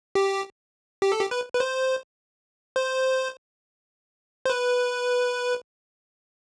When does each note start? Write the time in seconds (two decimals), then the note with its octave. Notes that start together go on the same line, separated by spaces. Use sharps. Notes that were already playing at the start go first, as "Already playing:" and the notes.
0.15 G4
1.02 G4
1.12 A4
1.21 G4
1.31 B4
1.54 B4
1.60 C5
2.76 C5
4.45 C5
4.50 B4